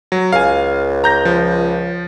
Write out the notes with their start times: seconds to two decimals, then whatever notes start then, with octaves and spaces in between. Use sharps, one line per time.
0.12 F#3
0.32 C#2 F5 G#5
1.04 A#5 G6 A#6
1.25 F3